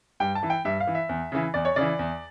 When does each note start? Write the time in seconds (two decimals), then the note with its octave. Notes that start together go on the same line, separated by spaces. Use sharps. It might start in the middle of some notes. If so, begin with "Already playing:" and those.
0.20 G2 G5
0.35 A5
0.43 E3
0.50 G5
0.65 G2 E5
0.80 F5
0.87 E3
0.95 E5
1.09 E2
1.32 C#3 E3
1.54 E2 D5
1.65 C#5
1.76 C#3 E3 D5
1.99 E2